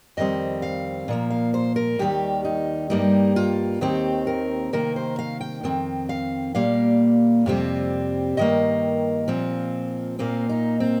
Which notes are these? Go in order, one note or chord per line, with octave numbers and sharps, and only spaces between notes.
F2 D#3 G3 C4 D#5
F5
A#2 F3 A#3
F5
C5
A#4
D#2 D#3 G3 G4
D#4
G2 G3 A#3 D#4
F4
D#2 D#3 C4 G4
A#4
C3 D#3 A#3 A#4
C5
F5
G5
F2 D#3 C4 G5
F5
A#2 G3 A#3 F5
F2 C3 G3 C4
G2 D#3 A#3 D#5
A#2 F3 C4
A#2 A#3 C4
D#4
C4